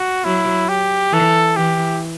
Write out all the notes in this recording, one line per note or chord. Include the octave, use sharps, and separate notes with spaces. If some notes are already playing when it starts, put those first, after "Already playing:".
Already playing: F#4
F#3 E4
G4
E3 A4
E3 G4